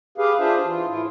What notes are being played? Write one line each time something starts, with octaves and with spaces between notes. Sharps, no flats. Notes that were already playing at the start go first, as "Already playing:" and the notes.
G4 G#4 B4 F5
D4 F4 G#4 C5 E5
E3 F4
A2 E4 F4